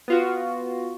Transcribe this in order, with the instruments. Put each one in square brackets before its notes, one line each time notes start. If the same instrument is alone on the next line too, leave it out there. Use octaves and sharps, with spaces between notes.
[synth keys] B3 F4 F#4